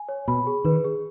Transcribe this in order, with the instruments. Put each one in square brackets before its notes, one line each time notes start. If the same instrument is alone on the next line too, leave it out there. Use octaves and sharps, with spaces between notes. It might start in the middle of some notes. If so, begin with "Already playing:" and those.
Already playing: [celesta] G#5
C#5
[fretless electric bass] B2 [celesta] B5
[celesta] G#4
[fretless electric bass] D#3 [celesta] B4
[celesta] G#4